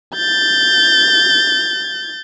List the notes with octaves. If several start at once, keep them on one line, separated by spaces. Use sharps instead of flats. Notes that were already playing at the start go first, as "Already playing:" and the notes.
G6 A6